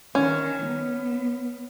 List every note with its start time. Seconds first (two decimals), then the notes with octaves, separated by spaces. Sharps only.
0.15 D#3 C#4
0.66 B3